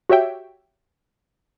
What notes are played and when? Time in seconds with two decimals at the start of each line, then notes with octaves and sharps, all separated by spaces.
0.09 F#4 G4 C#5 E5 G5